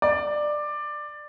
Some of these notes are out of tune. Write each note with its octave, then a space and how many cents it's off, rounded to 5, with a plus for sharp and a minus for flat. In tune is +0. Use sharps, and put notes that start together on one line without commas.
D5 +15